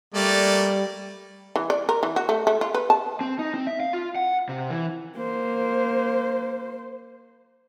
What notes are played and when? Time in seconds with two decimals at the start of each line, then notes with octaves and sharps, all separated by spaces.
0.14 G3 A3 A#3 D5
1.56 E3
1.70 D5
1.89 A#4
2.03 E3
2.16 F#4
2.29 A3
2.47 A3
2.61 F4
2.75 B4
2.90 A5
3.21 C4
3.39 D#4
3.54 C4
3.67 E5
3.80 F5
3.93 F4
4.16 F#5
4.49 C3
4.70 E3
5.16 A#3 C5